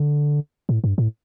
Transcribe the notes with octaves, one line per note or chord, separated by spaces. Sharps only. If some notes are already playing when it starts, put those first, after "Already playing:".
Already playing: D3
A2
G2
A2